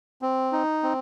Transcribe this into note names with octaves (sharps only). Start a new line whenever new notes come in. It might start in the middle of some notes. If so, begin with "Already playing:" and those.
C4
D#4
C4